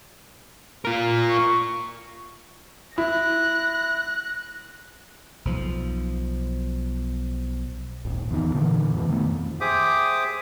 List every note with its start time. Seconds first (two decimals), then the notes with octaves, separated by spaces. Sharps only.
0.85 F4 A#4
1.30 C#6
2.98 E4 F#6 A#6
5.45 B1 F3
8.05 D#1 G#1
8.31 E2 B2 D#3
8.55 A#2 D3 E3 A#3
8.94 F2 B2 D#3 E3
9.09 D#3 A3 B3
9.23 F2
9.61 G4 G#4 C5 E5 D6 D#6